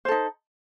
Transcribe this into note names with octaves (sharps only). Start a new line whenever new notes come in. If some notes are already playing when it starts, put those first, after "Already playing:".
D#4 A4 C5